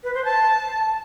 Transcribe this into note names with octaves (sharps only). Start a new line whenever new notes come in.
B4
C5
A5